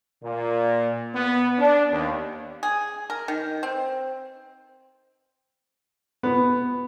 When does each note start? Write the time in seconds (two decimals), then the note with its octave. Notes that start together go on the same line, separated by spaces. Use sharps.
0.24 A#2
1.15 B3
1.59 D4
1.92 D#2
2.63 G#4
3.10 A#4
3.28 D#3
3.63 C4
6.23 B3